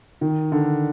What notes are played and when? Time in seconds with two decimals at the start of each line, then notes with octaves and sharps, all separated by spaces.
0.21 D#3
0.52 D3